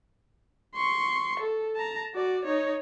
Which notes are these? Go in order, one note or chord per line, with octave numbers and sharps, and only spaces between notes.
C6 C#6
A4
A5 A#5
F#4 D5
D#4 C#5